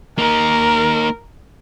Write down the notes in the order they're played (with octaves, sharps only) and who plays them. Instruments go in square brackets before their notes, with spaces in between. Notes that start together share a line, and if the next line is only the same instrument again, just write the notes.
[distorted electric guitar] A#3 D#4 [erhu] A#4